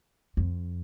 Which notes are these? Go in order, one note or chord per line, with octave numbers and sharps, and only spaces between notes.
F2